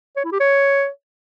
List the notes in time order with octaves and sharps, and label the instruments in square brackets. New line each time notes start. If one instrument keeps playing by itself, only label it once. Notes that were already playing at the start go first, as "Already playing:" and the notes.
[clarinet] C#5
E4
G4
C#5